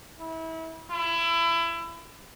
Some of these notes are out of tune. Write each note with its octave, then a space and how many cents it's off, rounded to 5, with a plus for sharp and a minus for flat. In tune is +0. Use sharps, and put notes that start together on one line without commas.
E4 -30
E4 +25